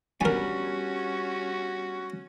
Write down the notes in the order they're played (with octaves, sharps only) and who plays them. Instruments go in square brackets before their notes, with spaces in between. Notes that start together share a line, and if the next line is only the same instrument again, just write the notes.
[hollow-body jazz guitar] G3 B3 D4 [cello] C#4 [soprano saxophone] F#4 [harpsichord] A#4 G#5